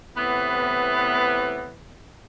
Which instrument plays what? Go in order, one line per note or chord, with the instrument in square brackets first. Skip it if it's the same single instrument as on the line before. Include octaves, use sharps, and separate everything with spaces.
[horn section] A2 C3 E3 B3